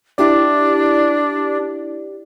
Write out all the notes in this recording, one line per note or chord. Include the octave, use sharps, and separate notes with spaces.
D4 E4 G4 D5